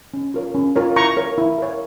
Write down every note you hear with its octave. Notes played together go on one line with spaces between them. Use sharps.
C#4
F4 A#4 C#5
C#4
F4 A#4 C#5
E4 A#5 C#6
A#4 C#5
E4
A#4 C#5